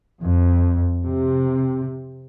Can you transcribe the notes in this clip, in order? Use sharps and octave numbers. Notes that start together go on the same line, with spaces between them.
F2
C3